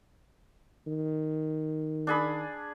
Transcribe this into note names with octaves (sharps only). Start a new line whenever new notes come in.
D#3
D4 G#4 B5